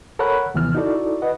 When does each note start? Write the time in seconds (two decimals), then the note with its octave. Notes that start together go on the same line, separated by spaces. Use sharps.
0.19 A4 A#4 C#5 F#5 B5 F#6
0.54 D#2 C3 E3 F3 B3 F6
0.75 D#4 E4 F#4 A4 D5
1.22 B4 D#5 F#5